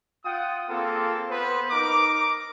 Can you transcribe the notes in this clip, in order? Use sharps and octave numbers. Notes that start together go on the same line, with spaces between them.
F4 F#5 G5 D#6
A#3 C4 F4 G#4 A4
B3 B4 C5
D#4 A#4 A#5 D6